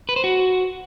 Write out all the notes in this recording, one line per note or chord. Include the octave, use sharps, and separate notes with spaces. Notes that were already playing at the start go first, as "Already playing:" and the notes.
B4
C5
F#4